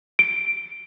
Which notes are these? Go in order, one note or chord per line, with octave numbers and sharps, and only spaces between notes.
D7